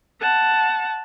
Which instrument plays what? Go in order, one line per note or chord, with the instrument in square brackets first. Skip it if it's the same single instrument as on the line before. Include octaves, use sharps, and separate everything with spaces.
[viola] F#5 A5